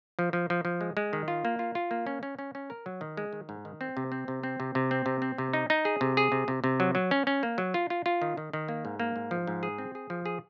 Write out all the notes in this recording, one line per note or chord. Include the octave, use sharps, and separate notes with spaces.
F3
F3
F3
F3
G#3
G#3
D#3
F4
A#3
F4
F4
A#3
C#4
C#4
C#4
C#4
A#4
F#3
D#3
G#3
D#3
G#2
D#3
C4
C3
C4
C3
C4
C3
C3
C4
C3
C4
C3
D#4
D#4
G#4
C3
G#4
C3
C3
C3
F#3
F#3
C#4
C#4
A#3
F#3
F4
F4
F4
D#3
D#3
D#3
A#3
G#2
A#3
G#2
F3
G#2
G#4
C4
G#4
F3
G#4